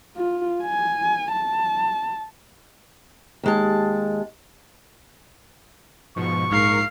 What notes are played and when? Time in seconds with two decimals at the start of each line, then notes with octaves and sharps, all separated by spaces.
0.16 F4
0.64 G#5
1.32 A5
3.43 D#2 G#3 A5
6.16 G#2 B2 F3 C#6
6.51 A#1 G#2 A#4 F5 C7